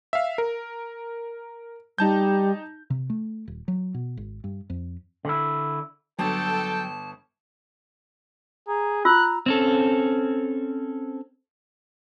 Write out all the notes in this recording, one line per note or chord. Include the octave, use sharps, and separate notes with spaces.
E5 F5
A#4
G3 D#4 A5 G6
C3
A3
D#1
F#3
B2
G#1
G2
F2
D3 E4
G1 F#3 A4 G5 A5
G#4 A#5
F4 A#5 E6 F#6
C4 C#4 A4